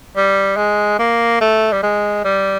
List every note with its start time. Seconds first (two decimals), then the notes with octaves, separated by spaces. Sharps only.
0.16 G3
0.57 G#3
0.99 A#3
1.41 A3
1.72 G3
1.83 G#3
2.24 G3